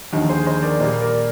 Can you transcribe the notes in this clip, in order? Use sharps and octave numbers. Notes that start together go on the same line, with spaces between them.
D#2 D3 F3 D#4
G#4 C5
C5 D#5
A#4 D5
A#2 G3 A#3 C5 D#5
A#4 D5